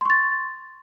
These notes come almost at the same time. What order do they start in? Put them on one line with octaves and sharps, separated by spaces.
C6 C#6 A6